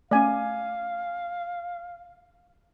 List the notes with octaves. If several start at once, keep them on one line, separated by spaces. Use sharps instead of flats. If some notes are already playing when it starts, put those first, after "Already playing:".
A3 C#4 D5 F5 G#5